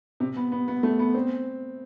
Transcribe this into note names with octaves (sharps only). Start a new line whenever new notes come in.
C3
B3
B3
B3
A3
B3
C4